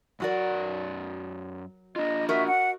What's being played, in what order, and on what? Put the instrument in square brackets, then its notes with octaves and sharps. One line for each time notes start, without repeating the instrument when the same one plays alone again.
[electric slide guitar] F#2 D5 [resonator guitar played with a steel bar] F#3 F#4 A#4
[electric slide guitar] D4 F4 [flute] D#5
[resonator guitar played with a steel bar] F#4 A#4 D#5 [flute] E5
[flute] F#5